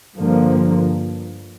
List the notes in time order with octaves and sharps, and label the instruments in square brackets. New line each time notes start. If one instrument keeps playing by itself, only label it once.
[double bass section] G2 D3 F3 A#3